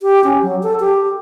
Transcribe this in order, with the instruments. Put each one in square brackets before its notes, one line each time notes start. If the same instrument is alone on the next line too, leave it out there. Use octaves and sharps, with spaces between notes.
[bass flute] G4
C#4
F#3
A4
G4